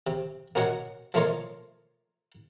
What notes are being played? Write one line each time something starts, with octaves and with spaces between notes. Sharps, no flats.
C3
A#3 C#4 F#4 C#5 D#5 F#5
F3 A3 A#3 F4 C#5 D#5